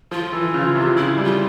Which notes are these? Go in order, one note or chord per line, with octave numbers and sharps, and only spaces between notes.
F3 F4
E3
C#3
C3
C#3 E4
G3
F4